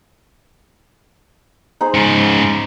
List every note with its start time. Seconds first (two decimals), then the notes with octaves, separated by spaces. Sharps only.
1.81 D#4 G#4 C5
1.95 G#2 C#3